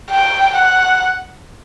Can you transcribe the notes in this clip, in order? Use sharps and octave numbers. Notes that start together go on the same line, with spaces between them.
G5
F#5